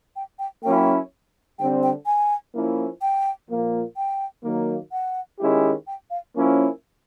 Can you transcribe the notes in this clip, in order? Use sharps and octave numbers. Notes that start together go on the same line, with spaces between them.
G5
G5
F#3 A#3 C#4 E4 G5
D3 G3 C4 G5
G5
G#5
F3 A#3 C#4 E4
G5
A#2 F3 A#3
G5
D#3 F#3 A#3
F#5
D#3 G#3 C#4 E4 G4
G5
F5
F3 A#3 C#4 E4